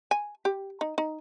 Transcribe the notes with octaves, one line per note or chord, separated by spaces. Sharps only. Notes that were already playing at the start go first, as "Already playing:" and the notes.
G#5
G4
D#4
D#4